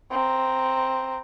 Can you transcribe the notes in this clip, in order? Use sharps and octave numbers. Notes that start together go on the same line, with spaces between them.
C4 A#5